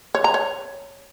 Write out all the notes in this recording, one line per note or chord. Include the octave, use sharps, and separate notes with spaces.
C#5
A#5
C#5